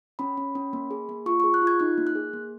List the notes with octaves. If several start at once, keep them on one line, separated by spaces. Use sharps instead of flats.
C#4 B5
C#4
C#4
A#3
G#4
A#3
F4 C#6
G#4 C#6
F#6
F4
G#6
D#4 F#6
A#3
F#6
G#4
A#3